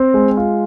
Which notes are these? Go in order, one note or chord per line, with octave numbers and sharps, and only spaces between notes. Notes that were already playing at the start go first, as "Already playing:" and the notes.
Already playing: C4
G#3
F4